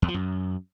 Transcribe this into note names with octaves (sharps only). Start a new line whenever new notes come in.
E2
F3
F#2